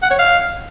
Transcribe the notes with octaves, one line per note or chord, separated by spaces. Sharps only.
F#5
C#5
F5